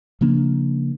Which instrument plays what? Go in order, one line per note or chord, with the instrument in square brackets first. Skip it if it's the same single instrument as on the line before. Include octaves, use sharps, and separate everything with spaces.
[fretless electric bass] C#3 F3 A#3 D4